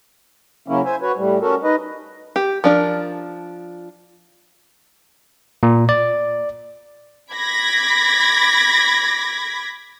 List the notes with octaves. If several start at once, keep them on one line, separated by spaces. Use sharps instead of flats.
C#3 F#3 A#3 C#4 E4
C5 E5 G#5
F#4 B4 C#5
A2 G3
C#4 F#4 A4 A#4
D#4 B4 D#5
G4
F3 D4 A#4
A#2
D5
B5 D6 G#6 A#6 B6